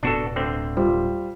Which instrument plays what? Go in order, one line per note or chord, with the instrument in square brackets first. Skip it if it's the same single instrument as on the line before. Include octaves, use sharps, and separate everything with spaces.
[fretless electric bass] D1 B2 B3 [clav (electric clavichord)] D4 F#4 A4
[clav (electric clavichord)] D2 D3 C4
[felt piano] G3 F4 C5